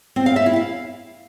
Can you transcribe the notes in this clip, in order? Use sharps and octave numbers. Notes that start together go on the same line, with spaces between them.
C4
F5
E5
E4
F5